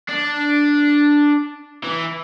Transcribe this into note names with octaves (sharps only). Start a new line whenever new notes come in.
D4
E3